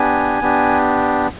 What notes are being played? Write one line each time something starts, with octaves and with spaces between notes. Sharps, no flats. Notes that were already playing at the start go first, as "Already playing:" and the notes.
Already playing: B3 D4 G4 G#5
B3 D4 G4